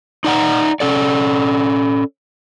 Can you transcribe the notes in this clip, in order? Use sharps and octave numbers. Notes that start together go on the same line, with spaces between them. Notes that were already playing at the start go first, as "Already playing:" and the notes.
D#4 D5 F#5 A#5
C#4 A4 D5